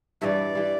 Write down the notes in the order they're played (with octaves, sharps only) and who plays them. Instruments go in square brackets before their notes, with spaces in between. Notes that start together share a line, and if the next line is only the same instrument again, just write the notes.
[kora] G2 E3 G3 [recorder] D5 E5
[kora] E3 G3